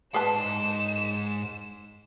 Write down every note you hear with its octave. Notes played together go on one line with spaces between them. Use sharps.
G#2 G#4 B4 A5 C6 E7